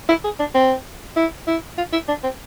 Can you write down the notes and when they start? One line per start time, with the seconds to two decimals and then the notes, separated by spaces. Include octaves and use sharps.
0.09 E4
0.24 G#4
0.40 D4
0.55 C4
1.17 E4
1.47 E4
1.78 F4
1.93 E4
2.08 D4
2.24 C4